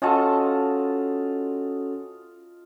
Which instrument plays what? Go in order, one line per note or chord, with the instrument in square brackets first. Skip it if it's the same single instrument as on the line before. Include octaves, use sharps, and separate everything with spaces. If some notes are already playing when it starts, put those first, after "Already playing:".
[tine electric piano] C#4 F#4 A4 [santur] F4 D#5 A5